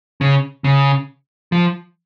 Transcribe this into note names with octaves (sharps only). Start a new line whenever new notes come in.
C#3
C#3
F3